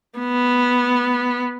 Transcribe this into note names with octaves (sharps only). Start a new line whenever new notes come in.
B3